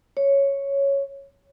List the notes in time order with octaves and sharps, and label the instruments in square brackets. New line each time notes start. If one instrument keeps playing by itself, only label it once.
[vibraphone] C#5